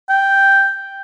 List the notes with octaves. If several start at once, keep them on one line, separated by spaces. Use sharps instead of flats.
G5